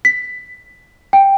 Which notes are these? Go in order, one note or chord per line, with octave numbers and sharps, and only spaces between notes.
B6
G5